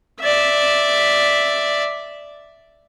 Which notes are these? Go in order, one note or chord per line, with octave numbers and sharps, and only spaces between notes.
D5 E5